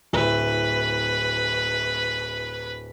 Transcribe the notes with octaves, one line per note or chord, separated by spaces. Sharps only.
D1 E4 B4